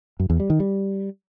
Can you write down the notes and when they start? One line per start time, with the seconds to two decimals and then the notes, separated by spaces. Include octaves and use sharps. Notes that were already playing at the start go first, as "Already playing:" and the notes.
0.20 F#2
0.30 E2
0.40 G3
0.50 D#3
0.60 G3